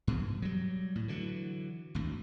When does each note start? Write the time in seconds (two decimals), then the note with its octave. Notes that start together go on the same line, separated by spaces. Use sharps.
0.07 G2 B2 E3
0.42 F#3 G3
0.95 A2
1.08 D3 E3 F#3
1.95 G#1 D2